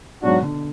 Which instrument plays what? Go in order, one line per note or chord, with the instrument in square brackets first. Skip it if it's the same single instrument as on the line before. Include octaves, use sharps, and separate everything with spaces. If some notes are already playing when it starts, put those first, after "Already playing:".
[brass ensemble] G#2 F#3 D4 F#4 [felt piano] B2
[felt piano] D3